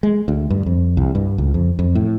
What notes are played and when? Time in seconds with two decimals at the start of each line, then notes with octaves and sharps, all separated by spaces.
0.03 G#3
0.28 D2
0.50 G2
0.66 F2
0.97 C2
1.15 G2
1.38 C#2
1.54 F2
1.79 F2
1.95 A2